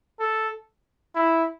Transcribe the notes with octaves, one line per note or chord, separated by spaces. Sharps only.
A4
E4